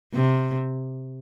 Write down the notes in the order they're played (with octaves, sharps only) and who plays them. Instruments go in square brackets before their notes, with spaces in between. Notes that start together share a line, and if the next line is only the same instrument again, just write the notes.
[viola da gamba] C3